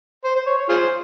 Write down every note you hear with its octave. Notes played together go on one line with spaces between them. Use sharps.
C5
C5
C#5
C#5
F4 G#4 C5